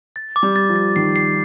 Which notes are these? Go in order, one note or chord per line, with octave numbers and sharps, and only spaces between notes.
A6
D6
G3
A6
F3
A6
D#3 C7
C7